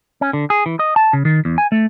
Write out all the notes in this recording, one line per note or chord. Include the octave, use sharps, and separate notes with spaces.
C#4
D3
G#4
E3
D#5
A5
C#3
D#3
E2
G#5
A3